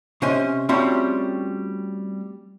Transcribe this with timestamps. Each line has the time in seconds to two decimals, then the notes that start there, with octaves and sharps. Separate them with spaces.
0.22 C3 C#4 C5 D#5 G#5 C6
0.69 G3 A3 C4 C#4 F4 F#4